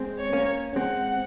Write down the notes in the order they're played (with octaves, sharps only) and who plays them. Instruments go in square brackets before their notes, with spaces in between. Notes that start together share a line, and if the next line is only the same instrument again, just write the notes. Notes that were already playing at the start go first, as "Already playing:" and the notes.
Already playing: [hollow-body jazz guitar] G#3 C4
[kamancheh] C#5
[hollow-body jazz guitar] A#3 C#4
[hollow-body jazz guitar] G#3 C4 [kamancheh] F#5